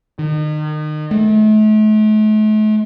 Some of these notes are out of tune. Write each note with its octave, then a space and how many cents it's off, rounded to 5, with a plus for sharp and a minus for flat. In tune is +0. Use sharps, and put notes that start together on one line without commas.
D#3 -35
A3 -40